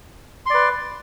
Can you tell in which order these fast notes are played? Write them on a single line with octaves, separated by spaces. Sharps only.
C6 D5 B4